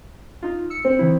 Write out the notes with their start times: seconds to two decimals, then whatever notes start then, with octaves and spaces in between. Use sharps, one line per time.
0.43 D#4 F4
0.70 E6 C#7
0.85 C4
0.99 D#3 E3 E4